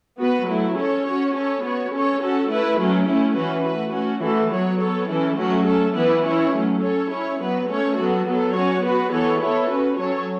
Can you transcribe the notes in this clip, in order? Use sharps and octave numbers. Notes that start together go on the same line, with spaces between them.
B3 F#4 B4
F#3 A3 E4
C#4 A4 C#5
C#4 F#4 C#5
C#4 A4 C#5
B3 F#4 C#5
C#4 A4 C#5
C#4 F#4 A4
A3 E4 B4
F#3 A3 C#4
A3 C#4 E4
E3 C#4 F#4 B4
A3 F#4 B4
A3 C#4 F#4
E3 A3 F#4 A4
F#3 B3 F#4 C#5
B3 A4 C#5
E3 C#4 E4 A4
F#3 A3 C#4 F#4
A3 C#4 A4
E3 B3 E4 B4
E3 C#4 E4 C#5
F#3 A3 C#4
C#4 A4 C#5
C#4 E4 C#5
F#3 B3 F#4 B4
A3 C#4 A4 C#5
F#3 B3 F#4 A4
F#3 B3 A4
C#4 F#4 C#5
B3 F#4 B4
E3 B3 A4 C#5
B3 E4 A4 C#5
C#4 F#4 B4
F#3 C#4 A4 C#5